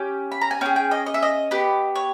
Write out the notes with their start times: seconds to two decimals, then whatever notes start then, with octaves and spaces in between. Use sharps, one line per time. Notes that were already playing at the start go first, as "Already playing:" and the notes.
Already playing: C#4 G4
0.32 B5
0.41 A#5
0.51 G#5
0.61 C#4 G#4 G5
0.76 G5
0.91 D#5
1.06 D#5
1.14 E5
1.23 D#5
1.51 B3 G4
1.95 C#5